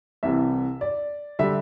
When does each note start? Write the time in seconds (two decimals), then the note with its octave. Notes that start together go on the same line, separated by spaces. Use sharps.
0.23 C2 C3 E3 E5
0.81 D5
1.39 D3 G3 E5